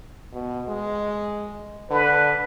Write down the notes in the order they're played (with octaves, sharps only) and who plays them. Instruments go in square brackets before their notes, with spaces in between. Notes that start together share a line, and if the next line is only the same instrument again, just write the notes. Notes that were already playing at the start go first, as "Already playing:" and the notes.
[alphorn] B2
G#3
[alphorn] D3 [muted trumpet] B4